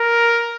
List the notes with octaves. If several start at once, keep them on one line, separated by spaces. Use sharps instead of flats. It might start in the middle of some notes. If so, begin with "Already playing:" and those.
Already playing: A#4